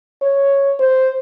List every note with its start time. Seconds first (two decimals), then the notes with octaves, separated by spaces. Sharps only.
0.22 C#5
0.80 C5